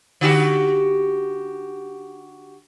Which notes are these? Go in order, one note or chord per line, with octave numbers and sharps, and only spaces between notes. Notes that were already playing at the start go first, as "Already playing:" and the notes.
D3 F#4 G4